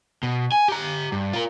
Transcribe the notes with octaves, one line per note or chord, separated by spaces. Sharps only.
B2
G#5
G4 A#5
G2
F4 A#4